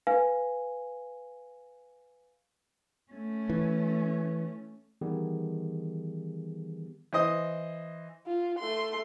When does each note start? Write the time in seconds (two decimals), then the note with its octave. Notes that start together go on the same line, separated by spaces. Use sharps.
0.07 B4 F5 G#5
3.12 A3 C#4
3.50 E3
5.01 D#3 E3 G3 B3 G4 G#4
7.13 E3 C5 D#5 D#6
8.27 F4
8.59 A3 C6